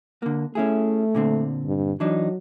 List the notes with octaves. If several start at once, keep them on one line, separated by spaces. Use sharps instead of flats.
D3 A#3
A3 C#4 E4 G#4
A#2 D3 C4
G2
E3 F#3 D4 D#4